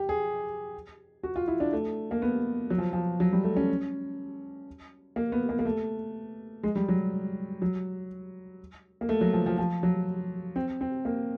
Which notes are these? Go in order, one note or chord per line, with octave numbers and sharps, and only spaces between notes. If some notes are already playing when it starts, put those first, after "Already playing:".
Already playing: G4
G#4
F#4
F4
E4
D4
A3
A#3
B3
F#3
F3
F3
F#3
G3
A3
C#4
A#3
B3
A#3
A#3
A3
G#3
G3
F#3
F#3
A#3
A3
F#3
F3
F3
F3
F#3
C4
C4
A#3